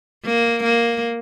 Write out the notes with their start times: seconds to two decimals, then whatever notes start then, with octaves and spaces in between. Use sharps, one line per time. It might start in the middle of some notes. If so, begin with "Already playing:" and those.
0.25 A#3
0.63 A#3